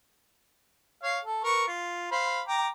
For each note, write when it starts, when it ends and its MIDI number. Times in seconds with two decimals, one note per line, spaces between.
1.03 1.19 73
1.03 1.19 77
1.25 1.44 69
1.44 1.64 70
1.44 1.64 71
1.44 1.64 85
1.67 2.11 65
2.12 2.41 72
2.12 2.41 77
2.12 2.41 83
2.47 2.68 79
2.47 2.68 82
2.47 2.68 86